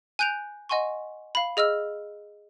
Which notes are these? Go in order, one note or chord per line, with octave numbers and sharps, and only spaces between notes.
G#5 F#6 G6 D7 F7
D#5 F#5 G#5 C6 C#6
F5 B5
G#4 D#5 E6 F6